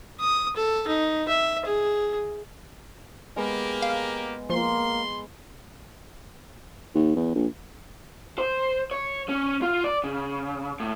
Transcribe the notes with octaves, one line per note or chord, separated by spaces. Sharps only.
D#6
A4
D#4
E5
G#4
G#3 A#3 B3 G4 A#4
F5
F3 A#3 C6
D#2
E2
A#1
C5
C#5
C#4
F4
D5
C#3
A2